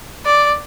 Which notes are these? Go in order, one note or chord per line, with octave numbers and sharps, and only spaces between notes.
D5